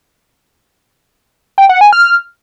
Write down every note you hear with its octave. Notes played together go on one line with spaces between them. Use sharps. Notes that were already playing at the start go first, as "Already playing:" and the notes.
G5
F#5
G#5
F6